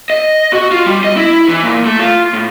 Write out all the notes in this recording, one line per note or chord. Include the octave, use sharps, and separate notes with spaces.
D#5
F#4
F4
G3
D#5
E4
E3
A#2
A3
F4
A2